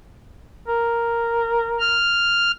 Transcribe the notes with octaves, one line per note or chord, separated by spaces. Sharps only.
A#4
F6